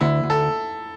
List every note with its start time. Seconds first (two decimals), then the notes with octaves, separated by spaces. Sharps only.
0.01 D2 E4
0.23 D2
0.30 A4